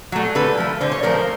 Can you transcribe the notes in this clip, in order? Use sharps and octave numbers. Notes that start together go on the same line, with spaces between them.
F#3 A3
D3 A4 B4
F3 A3
D3 C5
C#5
F3 A3 A#4 C5